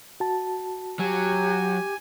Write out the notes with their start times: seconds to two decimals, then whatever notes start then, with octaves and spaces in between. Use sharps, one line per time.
0.20 F#4 A5
0.99 F#3 G4 G#5